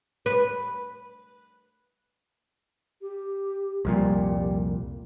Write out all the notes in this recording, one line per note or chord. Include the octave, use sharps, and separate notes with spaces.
B4
G4
C2 F2 A#2 G3